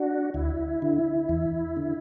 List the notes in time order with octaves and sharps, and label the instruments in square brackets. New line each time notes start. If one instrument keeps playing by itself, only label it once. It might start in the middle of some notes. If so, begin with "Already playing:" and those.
Already playing: [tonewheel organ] D4 F#4
D2 E4
D3
E2
D3